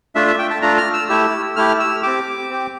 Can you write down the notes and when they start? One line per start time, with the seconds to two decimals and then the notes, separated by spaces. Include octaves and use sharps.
0.15 A3 D4 F4 E5
0.27 E5
0.39 G5
0.50 A5
0.62 A3 D4 F4 A#5
0.78 F6
0.94 E6
1.09 A3 E4 G4 E6
1.56 A3 E4 G4 F6
1.80 E6
2.03 C4 G4 D6
2.50 C4 G4